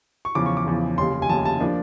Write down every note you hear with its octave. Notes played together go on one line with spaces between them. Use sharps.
C#6
E2 C#3 F3 D6
C#6
D6
E2 C#3 F3
F1 D#2 C#3 C6
G#5
F1 D#2 C#3 A5
A5
F3 A#3 D4